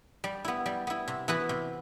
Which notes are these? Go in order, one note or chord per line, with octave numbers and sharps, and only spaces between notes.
G3
B3 E4
G3
B3 E4
C3
E3 B3 F#4 B4
C3